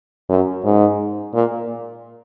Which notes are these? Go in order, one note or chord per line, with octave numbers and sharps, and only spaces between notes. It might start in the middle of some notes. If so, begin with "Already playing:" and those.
F#2
G#2
A#2